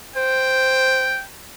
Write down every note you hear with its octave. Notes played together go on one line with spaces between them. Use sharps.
C5 G5